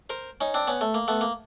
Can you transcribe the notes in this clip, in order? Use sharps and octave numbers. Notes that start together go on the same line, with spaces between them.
A#4 C5
C#4 D#4
C4 D4
B3 C#4
A3
A#3
A3 B3
A#3